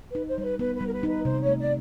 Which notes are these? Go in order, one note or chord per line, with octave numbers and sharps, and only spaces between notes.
D#4 B4
C5
G3 C5
B4
B3 B4
B4
G3
A#4
B4
D#4
B4
C3 C5
A3 C#5
D5